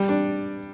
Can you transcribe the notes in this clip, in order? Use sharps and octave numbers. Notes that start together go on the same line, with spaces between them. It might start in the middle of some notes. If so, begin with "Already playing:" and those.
Already playing: G3
D4